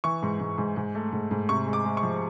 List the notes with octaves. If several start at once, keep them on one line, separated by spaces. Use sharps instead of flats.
E3 C#6
G#2
G#2
G#2
G#2
A3
G#2
G#2
C3 C#6
G#3
D6
G#3
C#6
F3